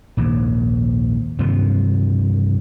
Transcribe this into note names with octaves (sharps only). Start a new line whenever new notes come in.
A#1 D#2 G#2
G2 C3 D#3 F3